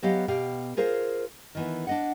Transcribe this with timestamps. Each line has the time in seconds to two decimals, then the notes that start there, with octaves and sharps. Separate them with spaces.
0.03 F#3 B3 G4 D#5 F5
0.28 B2 G4 F5 G5
0.77 F4 G#4 A#4 C5 F5
1.55 D#3 E3 B3
1.87 D4 D#5 F#5